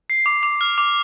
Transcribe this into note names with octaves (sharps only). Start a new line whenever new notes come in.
C7
D6
D6
F6
D6